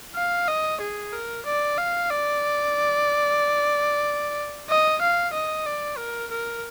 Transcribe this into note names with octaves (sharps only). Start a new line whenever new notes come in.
F5
D#5
G#4
A#4
D5
F5
D5
D#5
F5
D#5
D5
A#4
A#4